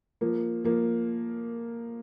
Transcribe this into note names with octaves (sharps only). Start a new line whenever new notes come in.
F3 A#3
F3 A#3